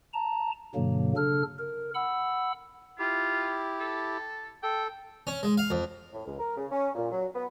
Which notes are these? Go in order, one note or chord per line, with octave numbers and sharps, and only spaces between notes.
A5 A#5
G2 B2 D3 F#3 A#3
C#3 D4 A4 F6
A#4
F#5 B5 E6
E4 F4 G4
A4
A4 G5
C#4
G#3
F5
F2
A2
C#2
A#4
C#3
C#4
A#2
F#3
B3